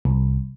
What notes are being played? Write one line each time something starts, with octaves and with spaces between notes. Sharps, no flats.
C2